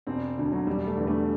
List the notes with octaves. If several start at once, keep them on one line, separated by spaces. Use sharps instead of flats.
E1 C4
D2 D3
F#3
E1 G3
A3
E2 D3
A3